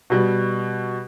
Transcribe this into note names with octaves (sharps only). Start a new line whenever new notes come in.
B2 G3